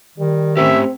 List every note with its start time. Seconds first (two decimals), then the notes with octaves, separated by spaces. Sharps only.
0.18 D#3 G3
0.57 A3 C4 C#4 G4 E5